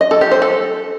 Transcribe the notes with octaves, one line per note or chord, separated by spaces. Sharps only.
D#5
A4
G4
C5
A4